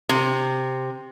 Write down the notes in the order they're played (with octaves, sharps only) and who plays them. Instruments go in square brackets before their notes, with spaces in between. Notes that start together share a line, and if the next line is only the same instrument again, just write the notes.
[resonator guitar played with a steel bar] C3